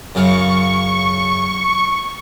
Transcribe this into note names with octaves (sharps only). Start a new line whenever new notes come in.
F#2 C#3 F5 C#6